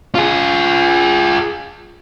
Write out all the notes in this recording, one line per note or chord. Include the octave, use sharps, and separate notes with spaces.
F4 G#4